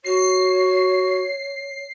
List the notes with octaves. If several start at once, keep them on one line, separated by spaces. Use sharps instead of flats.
F#4 C#5 C7